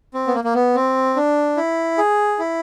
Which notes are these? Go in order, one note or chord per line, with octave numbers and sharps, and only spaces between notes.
C4
B3
A#3
A#3
B3
C4
D4
E4
G#4
E4